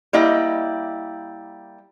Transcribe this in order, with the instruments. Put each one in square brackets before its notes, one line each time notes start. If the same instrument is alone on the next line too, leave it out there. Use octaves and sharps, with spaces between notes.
[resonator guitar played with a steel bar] G3 A#3 E4 D#5